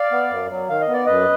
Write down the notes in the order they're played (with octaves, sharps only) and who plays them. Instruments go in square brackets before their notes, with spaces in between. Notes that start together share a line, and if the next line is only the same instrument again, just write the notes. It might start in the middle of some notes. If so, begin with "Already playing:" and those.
Already playing: [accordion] D5 F5
B3
F#2
F#3
D#3 F5
D#5
B3
D5
F#2 B4 D#5